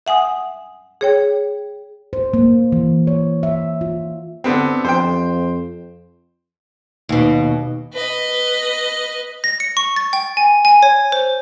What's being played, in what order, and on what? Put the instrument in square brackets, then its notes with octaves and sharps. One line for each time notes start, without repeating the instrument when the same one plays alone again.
[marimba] E5 F#5 G#5 D#6
G#4 C#5 G5
[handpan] C5
A#3
E3
C#5
E5
F4
[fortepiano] D3 B3 C4
[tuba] F2 [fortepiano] C5 G5
[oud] D#2 B2
[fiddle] B4 D#5
[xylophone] A#6
C#7
C#6
A6
G5
G#5
G#5
C#5
C5